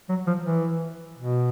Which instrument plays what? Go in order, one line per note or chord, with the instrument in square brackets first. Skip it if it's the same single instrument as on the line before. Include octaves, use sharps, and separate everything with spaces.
[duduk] F#3
F3
E3
B2